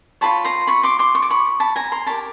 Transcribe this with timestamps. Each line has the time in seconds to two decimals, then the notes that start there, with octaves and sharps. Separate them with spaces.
0.21 F4 G#4 C#5 A5 B5
0.44 A#5 C6
0.67 B5 C#6
0.83 C6 D6
0.99 C6 D6
1.15 C#6
1.22 D6
1.30 B5 C#6
1.60 A5 B5
1.76 G#5 A#5
1.92 A#5 C6
2.06 C#5 A5 B5
2.10 G4 A#4